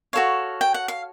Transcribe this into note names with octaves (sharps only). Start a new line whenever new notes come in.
F#4 A4 C#5 F5
G5
F#5
F5